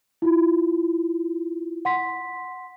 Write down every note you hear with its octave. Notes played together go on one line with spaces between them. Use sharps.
E4 F4
F#5 C6 B6